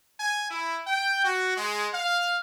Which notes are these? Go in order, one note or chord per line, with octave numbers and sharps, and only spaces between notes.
G#5
E4
G5
F#4
G#3
F5